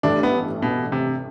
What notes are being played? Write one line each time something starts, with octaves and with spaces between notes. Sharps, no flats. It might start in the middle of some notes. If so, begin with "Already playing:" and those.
A1 G2 E3 A3 D4
B3
B2
C3